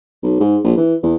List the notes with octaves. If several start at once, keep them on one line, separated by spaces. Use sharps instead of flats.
B1
G#2
A#1
E3
E2